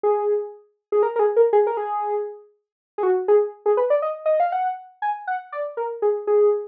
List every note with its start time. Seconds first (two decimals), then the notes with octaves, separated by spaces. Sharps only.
0.03 G#4
0.92 G#4
1.03 A#4
1.16 A#4
1.19 G#4
1.36 A#4
1.53 G#4
1.67 A#4
1.77 G#4
2.98 G#4
3.03 F#4
3.28 G#4
3.66 G#4
3.77 B4
3.90 D5
4.02 D#5
4.26 D#5
4.40 F5
4.52 F#5
5.02 G#5
5.27 F#5
5.52 D5
5.77 A#4
6.02 G#4
6.27 G#4